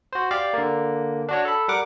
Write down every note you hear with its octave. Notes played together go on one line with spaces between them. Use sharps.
F#4 C5
G4 D5 F5
D3 A#3
D4 F#4 C#5
A4 B5
G3 A#4 F#5 D6